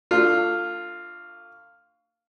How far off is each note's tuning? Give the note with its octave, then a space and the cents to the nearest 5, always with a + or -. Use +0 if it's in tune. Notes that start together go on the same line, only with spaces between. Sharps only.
A3 +40 D4 +10 F4 +0